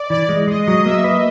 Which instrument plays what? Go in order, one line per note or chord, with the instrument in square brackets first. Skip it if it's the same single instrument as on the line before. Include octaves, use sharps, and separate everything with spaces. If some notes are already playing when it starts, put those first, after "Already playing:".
Already playing: [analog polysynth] D5
[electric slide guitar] E3 [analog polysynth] D5
[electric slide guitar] G#3
[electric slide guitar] G#3 [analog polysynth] D#5
[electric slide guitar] F#3 [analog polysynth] D#5
[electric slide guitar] A#3 [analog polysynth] E5
[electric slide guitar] B4